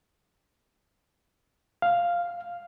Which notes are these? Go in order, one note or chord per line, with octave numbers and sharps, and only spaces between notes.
F5